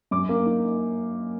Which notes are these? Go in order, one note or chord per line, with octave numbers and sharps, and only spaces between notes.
F#2 D6
A#3
D#4